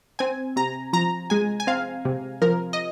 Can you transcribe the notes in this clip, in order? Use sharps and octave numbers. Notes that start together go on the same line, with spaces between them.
C4 G#5
C3 A#5
F3 A#5
G#3 G#5
G#5
C4 F5
C3
F3 A#4
D#5